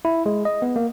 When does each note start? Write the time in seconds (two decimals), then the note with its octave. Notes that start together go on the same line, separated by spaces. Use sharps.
0.05 E4
0.26 G#3
0.45 D#5
0.62 B3
0.76 A#3